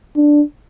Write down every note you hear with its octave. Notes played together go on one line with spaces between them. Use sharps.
D4